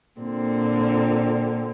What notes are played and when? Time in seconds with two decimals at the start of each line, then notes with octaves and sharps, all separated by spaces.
0.20 A#2 D3 C4